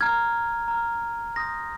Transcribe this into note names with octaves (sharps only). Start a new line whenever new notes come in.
A#5 F6 G#6
A#5 F6
C6 D#6 G6 A#6